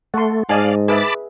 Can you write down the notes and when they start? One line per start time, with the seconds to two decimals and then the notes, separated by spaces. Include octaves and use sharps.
0.14 A3 F#5 C6
0.49 G#2 D5 D#5 F5 G#5 A5
0.88 G#4 B4 E5 A5 B5 D6